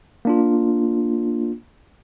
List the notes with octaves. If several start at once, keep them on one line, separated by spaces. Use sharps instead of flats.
A#3 D4 F4